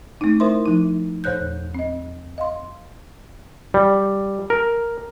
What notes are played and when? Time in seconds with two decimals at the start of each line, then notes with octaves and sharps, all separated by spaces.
0.21 A3 C4 D4 D#4
0.40 E4 A#4 C5 E5 C6
0.66 F3 D#4
1.24 E2 A#2 C5 C#5 F#6 G6
1.75 C4 D#5
2.38 D#5 F5 C6
3.74 G3
4.50 A#4